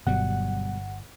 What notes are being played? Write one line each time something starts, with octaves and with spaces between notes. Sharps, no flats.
G1 B2 F#3 G3 F#5